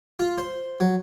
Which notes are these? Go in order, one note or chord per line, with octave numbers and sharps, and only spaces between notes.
F4
C5
F#3